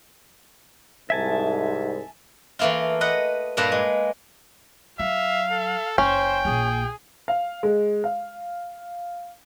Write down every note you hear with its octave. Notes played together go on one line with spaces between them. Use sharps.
C2 G#2 E5 G#5 A5
E3 A3 A#3 E4 F4
B4 D#5 F#5
G2 A#2 A#3 B4 A5 A#5
G#3
F#3 E5 F5
A4
F#1 C#4 C5 G5
A#1 A#3 G#4
F5
G#3
F5